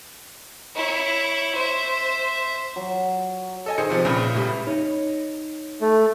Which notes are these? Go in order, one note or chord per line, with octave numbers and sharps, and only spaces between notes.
E4 C#5
C5 E5
F#3
A4 D#5 G#5
D#3 G#4 C5 C#7
C3 F3
A#1 C#3 B4
A2 G3
D#4 C#5
A3